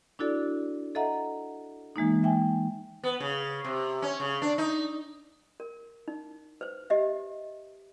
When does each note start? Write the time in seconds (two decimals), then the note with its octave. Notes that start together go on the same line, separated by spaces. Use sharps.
0.19 D4 E4 F#4 A4 D5
0.95 A4 D#5 E5 F#5 A#5
1.96 E3 G#3 A#3 D#4
2.23 E5 G5 G#5
3.03 B3
3.20 C#3
3.64 C3
4.02 C#4
4.20 C#3
4.42 D4
4.58 D#4
5.60 A#4
6.08 D#4
6.61 B4 C5
6.90 G4 D#5 E5